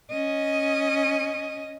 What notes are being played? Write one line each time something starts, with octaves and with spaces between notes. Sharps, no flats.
C#4 D#5